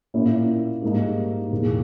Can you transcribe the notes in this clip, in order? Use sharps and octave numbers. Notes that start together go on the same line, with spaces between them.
A#2 A#3 C#4 E4
G#2 G3 A#3 D#4
E2 B2 A#3